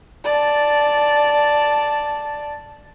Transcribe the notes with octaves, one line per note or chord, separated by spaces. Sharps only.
D5 A5